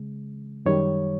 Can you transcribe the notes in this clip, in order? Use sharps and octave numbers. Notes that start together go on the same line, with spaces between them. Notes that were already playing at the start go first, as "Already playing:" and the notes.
Already playing: C#3 G#3
F#2 D#3 G3 C#5